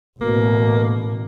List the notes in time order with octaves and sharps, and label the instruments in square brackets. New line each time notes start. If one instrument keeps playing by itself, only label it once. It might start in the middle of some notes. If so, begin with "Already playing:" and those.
[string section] A1 [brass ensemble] B2 A3 [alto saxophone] A#3